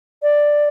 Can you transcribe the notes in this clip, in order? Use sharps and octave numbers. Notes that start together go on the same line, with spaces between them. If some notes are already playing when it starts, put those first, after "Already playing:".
D5